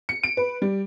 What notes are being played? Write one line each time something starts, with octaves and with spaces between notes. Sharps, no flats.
C#7
D7
B4
G3